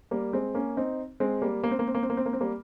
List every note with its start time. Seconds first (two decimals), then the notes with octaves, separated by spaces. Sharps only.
0.11 G3 A#3
0.33 G#3 C4
0.55 A#3 C#4
0.77 C4 D#4
1.20 G#3 C4
1.42 G3 A#3
1.64 A#3
1.71 C4
1.79 A#3
1.87 C4
1.95 A#3
2.03 C4
2.10 A#3
2.17 C4
2.26 A#3
2.33 C4
2.41 G3 A#3